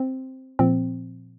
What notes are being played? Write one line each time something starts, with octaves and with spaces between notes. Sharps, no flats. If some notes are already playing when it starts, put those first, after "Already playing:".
Already playing: C4
A#2 F3 C4